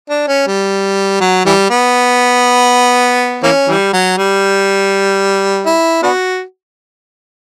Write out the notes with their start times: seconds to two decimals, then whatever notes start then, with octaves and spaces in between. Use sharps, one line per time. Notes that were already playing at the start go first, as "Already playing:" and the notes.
0.09 D4
0.28 C#4
0.47 G3
1.20 F#3
1.45 E3 G3
1.70 B3
3.43 E3 A#3 C#4
3.68 E3 G3
3.93 F#3
4.18 G3
5.66 E4
6.03 B3 D4 F#4